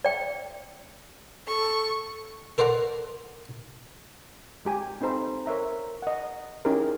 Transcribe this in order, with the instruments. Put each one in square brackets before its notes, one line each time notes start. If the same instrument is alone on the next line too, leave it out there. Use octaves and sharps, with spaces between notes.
[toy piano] D5 G5
[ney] A4 [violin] C#6
[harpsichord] A4 A#4 C5 D5 F#5 A#5
[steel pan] G#3 G4 G#5
C4 D#4 A4 C5 A#5 B5
A#4 C#5 E5 A#5
D#5 F#5
C#4 D#4 E4 G4 G#4 A#4